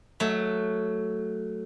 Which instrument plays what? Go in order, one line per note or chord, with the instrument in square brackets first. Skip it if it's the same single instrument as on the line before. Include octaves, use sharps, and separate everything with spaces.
[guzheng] F#3 A3